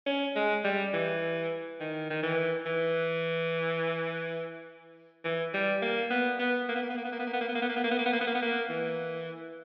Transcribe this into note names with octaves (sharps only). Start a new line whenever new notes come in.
C#4
G#3
G3
E3
D#3
D#3
E3
E3
E3
G3
A#3
B3
B3
A#3
B3
A#3
B3
A#3
B3
A#3
B3
A#3
B3
A#3
B3
A#3
B3
A#3
B3
A#3
B3
A#3
B3
A#3
B3
A#3
B3
A#3
E3